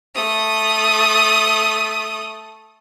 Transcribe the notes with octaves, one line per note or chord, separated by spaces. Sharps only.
A3 D#6